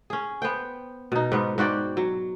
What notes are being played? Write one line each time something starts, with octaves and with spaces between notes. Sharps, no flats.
C#4 G#4
B3 C5 G5
B2 D#4
G#2 B3
G#2 F#4 D5 G5
F#3